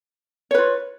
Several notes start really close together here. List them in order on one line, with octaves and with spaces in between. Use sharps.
C#5 B4 F4